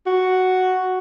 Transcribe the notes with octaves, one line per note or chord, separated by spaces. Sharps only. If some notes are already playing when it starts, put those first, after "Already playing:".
F#4